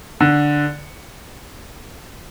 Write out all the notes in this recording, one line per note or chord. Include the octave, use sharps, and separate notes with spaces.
D3